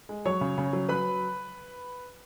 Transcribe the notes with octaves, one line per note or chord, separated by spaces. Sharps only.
G#3
F#3 C#5 C#6
C#3
C#3
F#3
F#3 B4 B5